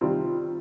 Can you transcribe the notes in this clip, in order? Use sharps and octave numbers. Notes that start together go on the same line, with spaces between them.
C3 D#3 G3 C4 F4